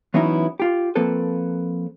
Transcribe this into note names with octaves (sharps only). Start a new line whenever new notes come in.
E3 F#3 B3 C#4 D#4 E4
F4 G4
F3 A#3 C4 A4 B4